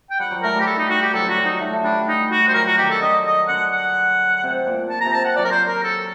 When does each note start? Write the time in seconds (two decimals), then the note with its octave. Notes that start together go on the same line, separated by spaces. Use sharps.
0.11 G5
0.19 G3 F#5
0.31 F#3
0.43 A3 A#4
0.55 G3
0.60 G4
0.67 A4
0.78 D#4
0.90 F#4
1.02 G4
1.13 F#3 A4
1.26 D3 F#4
1.37 F#3
1.45 D#4
1.60 A3
1.73 A3
1.84 G3 D4
2.08 D#4
2.32 F#4
2.49 C5
2.54 F#3 A#4
2.67 F#4
2.78 D#3 G4
2.90 A4
3.02 D3 D#5
3.26 D#5
3.48 D3 F#5
3.72 F#5
4.43 C3
4.67 A#2
4.90 A5
5.01 A#5
5.05 C3
5.13 A5
5.25 F#5
5.36 F#3 D5
5.45 A#4
5.52 C5
5.68 A#4
5.84 A4